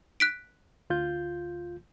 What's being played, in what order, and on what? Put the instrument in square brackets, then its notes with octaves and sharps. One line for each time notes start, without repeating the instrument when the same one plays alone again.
[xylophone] F#6 B6 D7
[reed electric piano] D2 F4 G6